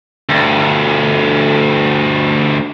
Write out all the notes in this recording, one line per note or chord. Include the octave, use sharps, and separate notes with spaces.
D2 G2